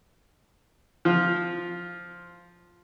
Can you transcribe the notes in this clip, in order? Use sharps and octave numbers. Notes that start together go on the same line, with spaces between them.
F3 F4